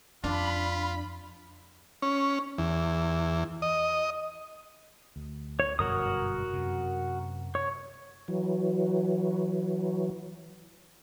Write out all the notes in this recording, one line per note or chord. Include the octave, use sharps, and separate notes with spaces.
F2 D4 F4 B5
C#4
E2
D#5
D2
C#5
G1 F#2 B2 F#4 A#4 D#6
F#2 C3
C#5
E3 F#3